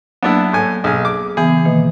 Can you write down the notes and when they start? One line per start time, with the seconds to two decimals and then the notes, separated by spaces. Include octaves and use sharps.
0.23 F#3 A#3 B3 D4 E4
0.53 A2 G#5
0.84 B1 G#4 G#5
1.05 D6
1.37 C#3 E3 B3 G#4
1.65 B2 D#3 A#3